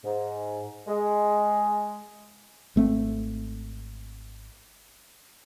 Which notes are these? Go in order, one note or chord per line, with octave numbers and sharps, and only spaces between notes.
G#2
G#3
G#1 A3 C4